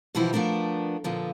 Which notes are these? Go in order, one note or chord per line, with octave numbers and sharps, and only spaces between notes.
B2 D3 E3 F3 E4 G4
F3 A3 B3 D4 A#4
A#2 D3 F3 B3